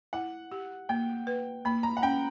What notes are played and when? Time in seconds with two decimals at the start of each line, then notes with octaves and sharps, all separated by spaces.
0.13 E4 F#5
0.52 G4
0.89 A#3 G5
1.27 B4
1.65 A#3 B5
1.83 A#5
1.97 F#5
2.02 C#4 G5